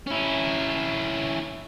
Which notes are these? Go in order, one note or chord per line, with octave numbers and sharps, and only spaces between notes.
C#4 E4